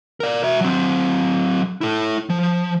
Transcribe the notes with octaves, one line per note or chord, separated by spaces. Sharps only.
A#4 D5
F#4 E5
F#3 C4
E4 A4
F3